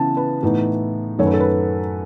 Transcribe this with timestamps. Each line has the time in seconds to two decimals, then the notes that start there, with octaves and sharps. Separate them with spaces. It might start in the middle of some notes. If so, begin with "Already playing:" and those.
Already playing: C#3 E3 B3 A5
0.17 B4
0.43 A2 E3 B3 D#4
1.19 F#2 D#3 F#3 A3 C#5
1.25 B4
1.34 A4
1.40 B4